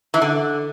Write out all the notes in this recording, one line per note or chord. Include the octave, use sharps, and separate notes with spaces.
E3
D3